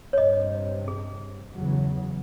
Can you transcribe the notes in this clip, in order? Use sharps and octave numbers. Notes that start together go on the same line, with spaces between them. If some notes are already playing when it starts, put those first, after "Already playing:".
G2 C3 C#5 D#5
G#4
E2 C#3 F#3